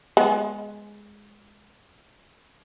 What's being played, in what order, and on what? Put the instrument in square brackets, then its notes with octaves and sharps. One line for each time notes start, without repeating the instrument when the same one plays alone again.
[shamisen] G#3 B3